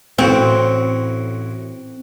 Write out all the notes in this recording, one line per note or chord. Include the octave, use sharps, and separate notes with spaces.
A1 A2 C4 F#4